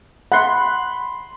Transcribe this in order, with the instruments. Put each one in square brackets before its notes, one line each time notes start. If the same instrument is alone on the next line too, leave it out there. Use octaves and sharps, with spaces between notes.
[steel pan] F#5 [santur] B5 C6